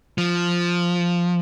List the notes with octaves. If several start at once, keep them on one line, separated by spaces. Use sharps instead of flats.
F3